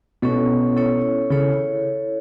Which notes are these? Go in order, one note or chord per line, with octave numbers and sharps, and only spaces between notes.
B2 C#4 E4 A4 C#5
C#4 E4 A4 C#5
C#3 E4 A4 C#5